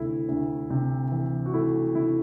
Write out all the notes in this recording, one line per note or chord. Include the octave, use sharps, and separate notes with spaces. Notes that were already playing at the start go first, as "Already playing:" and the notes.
Already playing: D2 C3 A3 E4
D2
C3
E3
F#4
A3 E4
C3 E4